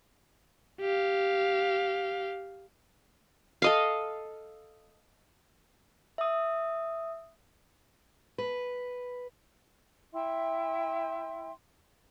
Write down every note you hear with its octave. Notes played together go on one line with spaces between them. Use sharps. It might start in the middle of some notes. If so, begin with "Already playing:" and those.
G4 F5
A4 D#5 F5
E5 D#6
B4
E4 E5 G5 C6